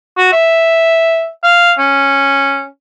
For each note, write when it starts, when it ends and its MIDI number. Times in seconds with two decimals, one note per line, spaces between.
0.18 0.28 66
0.32 1.28 76
1.44 1.72 77
1.78 2.66 61